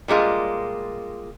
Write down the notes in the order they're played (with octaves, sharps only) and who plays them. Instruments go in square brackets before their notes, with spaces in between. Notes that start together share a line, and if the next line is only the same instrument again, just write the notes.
[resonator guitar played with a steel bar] A#2 G3 G#3 F4